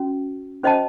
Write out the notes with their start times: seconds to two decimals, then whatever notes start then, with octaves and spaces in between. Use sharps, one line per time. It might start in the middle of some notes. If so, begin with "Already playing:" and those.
Already playing: C#4 F#4
0.63 C#4 F#4 C5 D#5 A5